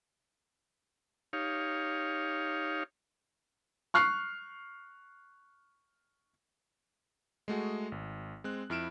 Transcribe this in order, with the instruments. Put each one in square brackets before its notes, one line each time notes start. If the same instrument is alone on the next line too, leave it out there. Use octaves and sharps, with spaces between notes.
[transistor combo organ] D#4 G4 C#5 F5
[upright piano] C#6 F6 F#6 C7
[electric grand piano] G#3 A3 F#4 G#4
G#1
G#3 C4 F#6
F2 E4 F6 D7 E7